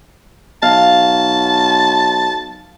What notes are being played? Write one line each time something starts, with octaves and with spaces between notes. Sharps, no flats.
B1 F5 A5